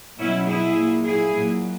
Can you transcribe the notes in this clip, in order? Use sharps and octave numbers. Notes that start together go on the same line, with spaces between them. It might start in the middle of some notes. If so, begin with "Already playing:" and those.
B2 F#3 C#4 E4
E4 G#4
A#2 F#3
E4 G#4
A#2 F#3